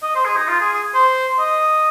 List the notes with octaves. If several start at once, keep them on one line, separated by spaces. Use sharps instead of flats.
D#5
C5
G#4
D#4
F4
G#4
G#4
C5
D#5